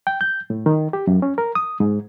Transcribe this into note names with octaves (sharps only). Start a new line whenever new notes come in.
G5
G6
A2
D#3
G4
F#2
C#4
A#4
D#6
G#2